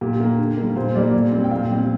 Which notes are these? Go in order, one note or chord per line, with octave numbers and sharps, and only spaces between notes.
A#2 G4
A#3
D3
G3 A#3
A#2 C5
G3 A#3 D5
A#2
G3 C4
G5
A#2 F5
G3 C4